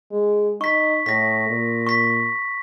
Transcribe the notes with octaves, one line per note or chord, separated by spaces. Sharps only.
G#3
D#4 C#6 B6
A2 A#6 B6
A#2
C#6 B6